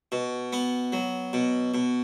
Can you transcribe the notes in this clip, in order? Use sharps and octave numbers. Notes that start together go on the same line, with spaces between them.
B2
B3
F#3
B2
B2